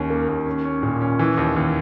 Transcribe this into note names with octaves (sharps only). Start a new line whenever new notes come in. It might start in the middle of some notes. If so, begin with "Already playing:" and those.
Already playing: D#2 C#4
A#3
D#2
C#4
C#4
A#2
C#4
E3
D#2
D#2